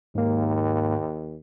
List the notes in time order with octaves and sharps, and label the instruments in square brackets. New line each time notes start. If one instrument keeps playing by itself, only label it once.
[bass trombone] D#2 [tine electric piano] G#2 A#3